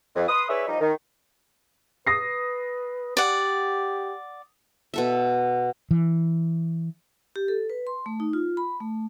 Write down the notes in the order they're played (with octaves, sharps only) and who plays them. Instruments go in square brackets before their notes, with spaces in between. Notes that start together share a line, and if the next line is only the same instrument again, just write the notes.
[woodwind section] F2
B4 C6 D#6
E4 G#4 B4 C#5 D5 E5
F3 G3 D#4
D#3
[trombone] B4 [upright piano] D#6 A#6 C7
[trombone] G4 [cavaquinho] D5 F#5
[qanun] B2 A4 E5
[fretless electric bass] E3
[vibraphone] G4
A4
B4
C6
A3
D#4
F4
B5
A3